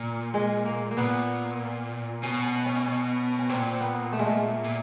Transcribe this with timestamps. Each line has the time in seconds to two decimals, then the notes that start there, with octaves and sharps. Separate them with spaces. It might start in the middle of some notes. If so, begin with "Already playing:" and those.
Already playing: A#2
0.34 G#3
0.65 A#3
0.91 A#3
0.97 A#2 B3
2.23 B2 C#4
2.45 C#4
2.66 C#4
2.88 C#4
3.39 C#4
3.49 A#2 C4
3.73 C4
3.81 B3
4.13 A3
4.19 G#3
4.27 A3
4.64 A#2